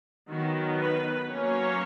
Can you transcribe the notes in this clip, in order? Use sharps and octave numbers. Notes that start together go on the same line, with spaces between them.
D#3 F#3 B3 F#4
B4
F#3 A#3 C#4 C#5